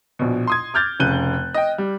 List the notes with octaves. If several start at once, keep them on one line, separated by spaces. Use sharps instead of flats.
A#1 B2
C6 D#6 G#6
D6 F6 G6 A6
F1 C#3 F#6 D#7 G7
D#5 G5
G3